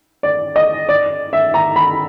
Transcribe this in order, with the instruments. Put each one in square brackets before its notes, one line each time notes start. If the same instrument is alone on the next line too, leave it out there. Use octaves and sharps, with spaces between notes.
[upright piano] D5
D#5
D5
E5
A#5
B5